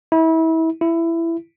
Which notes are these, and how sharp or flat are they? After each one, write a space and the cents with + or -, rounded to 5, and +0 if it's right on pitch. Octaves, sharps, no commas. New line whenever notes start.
E4 -30
E4 +15